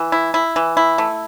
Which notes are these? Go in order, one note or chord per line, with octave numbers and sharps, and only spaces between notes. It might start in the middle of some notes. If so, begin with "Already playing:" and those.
Already playing: E3
E4
E4
E3
E4
A3